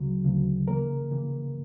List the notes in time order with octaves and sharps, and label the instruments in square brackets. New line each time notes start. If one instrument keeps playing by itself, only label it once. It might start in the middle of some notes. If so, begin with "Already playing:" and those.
Already playing: [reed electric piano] D2 C#3 F#3
D2 C#3 F#3
C#3 E3 A#3 A#4
C#3 E3 A#3